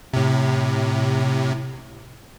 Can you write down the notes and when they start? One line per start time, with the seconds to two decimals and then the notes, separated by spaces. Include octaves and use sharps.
0.13 A2 C3